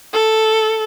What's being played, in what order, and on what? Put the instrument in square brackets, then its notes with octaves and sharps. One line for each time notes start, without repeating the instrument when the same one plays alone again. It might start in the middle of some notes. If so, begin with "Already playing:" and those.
[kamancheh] A4